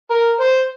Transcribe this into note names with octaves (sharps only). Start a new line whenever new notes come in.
A#4
C5